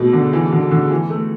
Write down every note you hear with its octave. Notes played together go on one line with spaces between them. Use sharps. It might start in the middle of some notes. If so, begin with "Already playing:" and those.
Already playing: B2 A3
D3
E3
D3
D3
E3
A3